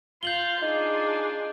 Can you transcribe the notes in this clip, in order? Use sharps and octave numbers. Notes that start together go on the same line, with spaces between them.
F4 F5 G6 F#7 G7
D4 D#4 F4 G#4